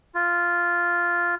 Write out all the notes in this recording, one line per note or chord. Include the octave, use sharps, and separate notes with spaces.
F4